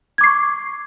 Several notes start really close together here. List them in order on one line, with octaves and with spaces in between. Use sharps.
G#6 D6 C7 C#6